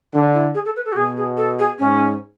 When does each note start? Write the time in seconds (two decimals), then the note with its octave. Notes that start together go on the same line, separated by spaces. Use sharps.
0.13 D3 D4
0.34 E4
0.54 G#4
0.65 A4
0.76 B4
0.85 A4
0.92 F#4
0.97 B2 G#4
1.17 G#4
1.37 A4
1.59 G#4
1.79 G#2 C#4